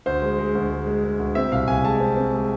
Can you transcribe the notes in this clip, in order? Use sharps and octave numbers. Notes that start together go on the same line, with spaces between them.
D2 C5
G#3
G#3
D2
G#3
G#3
G#3
D2
C4 E5
C2 F5
C2 G#5
G#3 A5
C4
C4
G#3